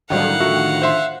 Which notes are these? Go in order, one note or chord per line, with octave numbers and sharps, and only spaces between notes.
A2 D3 D#3 F#3 G3 F5 F#5
D3 F3 F#4 E5
C5 E5 C6